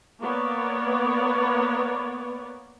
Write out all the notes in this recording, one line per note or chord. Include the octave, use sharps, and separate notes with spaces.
A#3 B3 C#5 D5